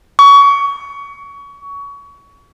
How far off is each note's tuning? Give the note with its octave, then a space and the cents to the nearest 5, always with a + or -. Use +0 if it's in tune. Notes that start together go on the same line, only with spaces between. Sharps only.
C#6 +25